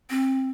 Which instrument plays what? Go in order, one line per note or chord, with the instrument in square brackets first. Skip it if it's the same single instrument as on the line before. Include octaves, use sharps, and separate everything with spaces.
[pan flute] C4